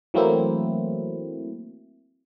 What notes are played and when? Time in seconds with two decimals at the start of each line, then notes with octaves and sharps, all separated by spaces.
0.14 E3 F#3 A3 A#3 C4 E4